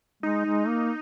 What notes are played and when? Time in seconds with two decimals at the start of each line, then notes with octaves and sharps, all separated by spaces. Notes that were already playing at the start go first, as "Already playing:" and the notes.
0.23 G#3 D#4
0.46 G#3
0.68 A#3